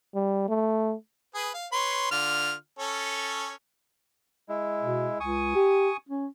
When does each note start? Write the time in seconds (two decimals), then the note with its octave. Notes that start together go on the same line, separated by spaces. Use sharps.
0.14 G3
0.48 A3
1.35 G#4 B4
1.54 F5
1.72 B4 C#5 C6
2.11 D3 F4 F6
2.79 C#4 A4 C#5
4.49 G#3 E4
4.82 B2
5.20 C#2 G#5 C#6 D#6
5.55 G4
6.09 C#4